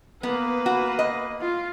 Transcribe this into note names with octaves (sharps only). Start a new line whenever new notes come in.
A#3 B3 B4
F#4
D#5
F4